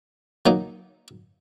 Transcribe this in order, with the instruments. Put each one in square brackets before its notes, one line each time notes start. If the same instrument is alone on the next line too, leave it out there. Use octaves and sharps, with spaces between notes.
[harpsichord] F#3 A#3 D#4